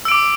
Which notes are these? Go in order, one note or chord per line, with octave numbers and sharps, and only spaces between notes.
D6 E6 D7